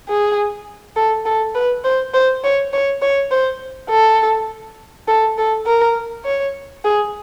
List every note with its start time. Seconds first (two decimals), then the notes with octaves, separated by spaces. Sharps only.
0.08 G#4
0.96 A4
1.25 A4
1.55 B4
1.84 C5
2.14 C5
2.44 C#5
2.73 C#5
3.02 C#5
3.31 C5
3.90 A4
5.08 A4
5.38 A4
5.66 A#4
6.25 C#5
6.84 G#4